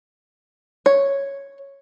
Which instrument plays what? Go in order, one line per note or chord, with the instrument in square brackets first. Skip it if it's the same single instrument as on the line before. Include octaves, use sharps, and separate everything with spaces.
[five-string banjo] C#5